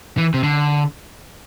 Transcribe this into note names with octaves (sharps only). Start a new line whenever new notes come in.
E3
C3
D3